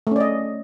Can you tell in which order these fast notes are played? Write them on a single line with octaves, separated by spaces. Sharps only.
A3 C#4 D5 D#5